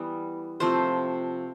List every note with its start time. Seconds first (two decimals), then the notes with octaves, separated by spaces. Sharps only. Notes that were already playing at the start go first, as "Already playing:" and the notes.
Already playing: E3 G3 B3
0.60 C3 F3 A3 C4 C5